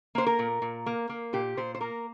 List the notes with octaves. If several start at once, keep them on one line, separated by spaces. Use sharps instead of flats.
A#3 C5
A#4
A#2
A#2
A#3
A#3
A#2 G4
A#2 C5
C5
A#3 A#4